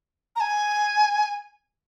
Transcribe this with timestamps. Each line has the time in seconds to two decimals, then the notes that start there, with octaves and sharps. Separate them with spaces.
0.36 A#5
0.40 G#5